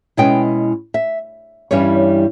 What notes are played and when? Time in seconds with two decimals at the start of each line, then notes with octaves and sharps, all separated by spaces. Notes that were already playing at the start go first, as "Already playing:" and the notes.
0.17 B2 G#3 C#4 E4 G5
0.94 E5
1.71 G2 E3 G3 C#4 C#5